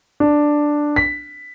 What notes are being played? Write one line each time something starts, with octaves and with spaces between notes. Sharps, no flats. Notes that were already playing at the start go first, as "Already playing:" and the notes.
D4
B6